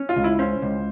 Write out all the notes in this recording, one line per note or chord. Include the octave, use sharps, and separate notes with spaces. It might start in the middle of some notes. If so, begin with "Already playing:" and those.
Already playing: C#4
F4
C#2
E4
C#4 C5
C#2